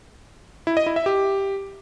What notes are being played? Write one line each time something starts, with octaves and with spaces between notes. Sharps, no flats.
E4
D#5
E4
E5
G4